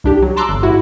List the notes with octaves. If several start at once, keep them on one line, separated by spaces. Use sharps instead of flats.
C2 D4 G4
F#3
A5 A#5 C6 D6 E6 F#6
G1
G#2 E4 F#4